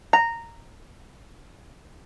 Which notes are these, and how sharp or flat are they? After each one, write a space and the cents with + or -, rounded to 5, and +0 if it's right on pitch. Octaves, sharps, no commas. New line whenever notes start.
A#5 -10